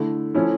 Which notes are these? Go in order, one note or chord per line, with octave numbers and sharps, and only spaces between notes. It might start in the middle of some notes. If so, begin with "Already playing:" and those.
Already playing: D3 A3 E4
F3 A3 C#4 E4